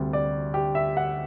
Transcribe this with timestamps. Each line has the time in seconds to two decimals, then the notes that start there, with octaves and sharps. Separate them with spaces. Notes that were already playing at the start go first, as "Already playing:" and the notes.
Already playing: D2 C3 G3
0.13 D5
0.54 G4
0.75 E5
0.97 F#5